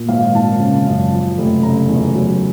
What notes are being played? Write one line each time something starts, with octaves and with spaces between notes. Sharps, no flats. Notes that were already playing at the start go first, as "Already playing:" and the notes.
Already playing: A#2
G#1 F5
G#1 A5
C#3
F#2
F3
F1
C#3 A#5
E2
F#3